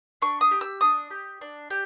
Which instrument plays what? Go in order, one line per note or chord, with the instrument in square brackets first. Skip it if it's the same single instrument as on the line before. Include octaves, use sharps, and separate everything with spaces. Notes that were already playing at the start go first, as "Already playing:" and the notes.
[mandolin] D4 C#6
D#6
G4
E6
D4 D#6
G4
D4
G4